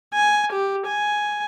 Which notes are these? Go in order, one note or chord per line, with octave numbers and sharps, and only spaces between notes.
G#5
G4
G#5